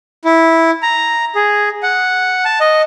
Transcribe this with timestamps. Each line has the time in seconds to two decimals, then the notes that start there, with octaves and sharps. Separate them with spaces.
0.25 E4
0.83 A#5
1.35 G#4
1.83 F#5
2.45 A5
2.60 D#5